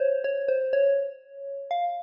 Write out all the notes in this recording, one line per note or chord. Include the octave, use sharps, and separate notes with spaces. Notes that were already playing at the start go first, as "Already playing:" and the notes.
Already playing: C5 C#5
C#5
C5
C#5
F5